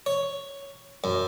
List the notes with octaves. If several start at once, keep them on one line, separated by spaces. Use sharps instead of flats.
C#5
F#2